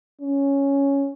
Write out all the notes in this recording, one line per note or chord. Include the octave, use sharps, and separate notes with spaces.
C#4